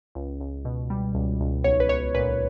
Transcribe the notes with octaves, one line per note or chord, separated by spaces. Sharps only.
C#2
C#2
B2
G3
C#2
C#2
B1 C#5
B4
B1 C#5
A#2 B4